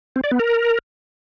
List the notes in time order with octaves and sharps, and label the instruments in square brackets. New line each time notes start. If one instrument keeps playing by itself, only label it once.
[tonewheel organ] C4
D5
B3
A#4